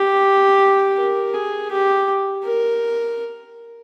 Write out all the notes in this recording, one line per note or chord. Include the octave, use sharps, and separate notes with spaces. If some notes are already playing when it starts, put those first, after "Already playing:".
Already playing: G4
A#4
G#4
G4
A#4